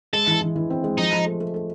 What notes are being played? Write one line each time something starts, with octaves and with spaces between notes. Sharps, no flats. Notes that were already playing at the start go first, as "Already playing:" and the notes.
G#3 A4
E3
E3
E3
C4
G#3
F3 D#4
F3
A3
A3
A3